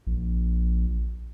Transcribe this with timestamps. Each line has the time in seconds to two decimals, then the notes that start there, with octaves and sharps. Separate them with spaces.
0.07 A#1